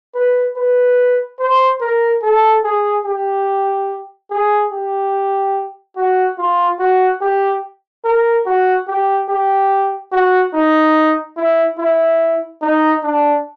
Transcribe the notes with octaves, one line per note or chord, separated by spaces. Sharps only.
B4
B4
C5
A#4
A4
G#4
G4
G#4
G4
F#4
F4
F#4
G4
A#4
F#4
G4
G4
F#4
D#4
E4
E4
D#4
D4